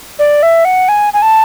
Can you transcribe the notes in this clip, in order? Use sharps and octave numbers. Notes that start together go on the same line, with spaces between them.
D5
E5
F#5
G#5
G#5
A5